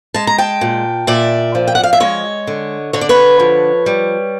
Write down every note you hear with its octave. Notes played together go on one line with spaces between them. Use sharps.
G#3 A5
A#5
G5 A5
A#2
A#2 D5 E5
F3
G5
F#5
F5
E5
G#3 C#5 D#5
D3
D3 C#5
D5
B4 C#5
F3
G3